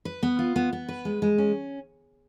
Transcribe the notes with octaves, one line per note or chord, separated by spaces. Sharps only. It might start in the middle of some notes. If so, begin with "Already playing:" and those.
B4
B3
F4
B3
B3
B4
G#3
G#3
C#4